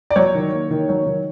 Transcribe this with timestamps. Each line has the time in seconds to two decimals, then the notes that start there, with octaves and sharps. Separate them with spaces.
0.10 D5
0.16 F#3 C#5
0.35 D#3
0.52 A#3
0.71 D#3
0.89 F#3
1.06 D#3